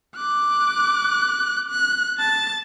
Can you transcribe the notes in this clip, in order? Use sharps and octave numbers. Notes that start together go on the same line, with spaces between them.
D6 F#6
F#6
A5 A6